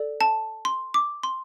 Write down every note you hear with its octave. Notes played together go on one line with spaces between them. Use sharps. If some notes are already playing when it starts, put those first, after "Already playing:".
Already playing: A4 D5
A5
C6
D6
C6